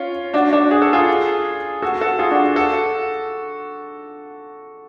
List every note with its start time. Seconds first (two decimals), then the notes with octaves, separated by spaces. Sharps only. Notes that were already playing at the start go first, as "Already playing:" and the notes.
Already playing: C#4 F4
0.34 D4 F#4
0.53 D4 F#4
0.71 G#4
0.82 A4
0.93 F4 G#4
1.82 F#4 A4
2.01 F#4 A4
2.19 F4 G#4
2.31 D4 F#4
2.56 F#4 A4